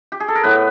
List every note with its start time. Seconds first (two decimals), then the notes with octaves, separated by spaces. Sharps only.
0.12 G4
0.20 G#4
0.28 A4
0.35 A#4
0.43 A2 B3 B4